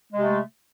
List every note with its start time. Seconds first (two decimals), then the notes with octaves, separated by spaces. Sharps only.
0.12 G#3
0.16 C3
0.21 A3